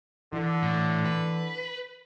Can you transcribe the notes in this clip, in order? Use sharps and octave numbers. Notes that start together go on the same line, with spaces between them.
D3 E3
A2
B4